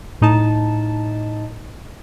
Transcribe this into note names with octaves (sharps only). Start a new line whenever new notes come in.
A2 D#4 A5